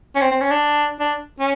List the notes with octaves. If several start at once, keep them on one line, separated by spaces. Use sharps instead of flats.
C#4
C4
C4
C#4
D4
D4
C#4